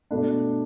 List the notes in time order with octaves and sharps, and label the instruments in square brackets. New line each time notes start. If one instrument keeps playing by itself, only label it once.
[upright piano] B2 A3 D4